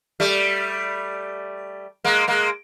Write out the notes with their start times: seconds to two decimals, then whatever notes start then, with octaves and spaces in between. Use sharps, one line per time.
0.20 G3 A3
2.04 G#3 A#3
2.28 G#3 A#3